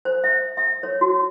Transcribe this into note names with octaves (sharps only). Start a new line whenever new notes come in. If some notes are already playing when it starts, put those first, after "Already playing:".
C5
E5
E5
C#5
F#4